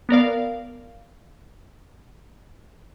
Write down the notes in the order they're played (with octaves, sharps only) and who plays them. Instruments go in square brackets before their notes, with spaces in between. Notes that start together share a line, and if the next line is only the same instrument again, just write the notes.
[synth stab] B3 A#4 D5 F5